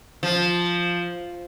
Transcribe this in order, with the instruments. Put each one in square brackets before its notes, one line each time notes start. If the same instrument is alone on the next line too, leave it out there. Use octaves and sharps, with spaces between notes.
[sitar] F3